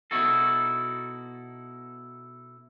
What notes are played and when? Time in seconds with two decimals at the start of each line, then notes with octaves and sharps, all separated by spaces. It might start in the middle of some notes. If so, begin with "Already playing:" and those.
0.11 B2 D#4 E4 F#4 A4